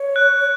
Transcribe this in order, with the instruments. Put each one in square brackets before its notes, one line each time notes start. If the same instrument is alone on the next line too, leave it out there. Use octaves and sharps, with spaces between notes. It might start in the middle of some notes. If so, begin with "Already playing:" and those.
Already playing: [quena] C#5
[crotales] F#6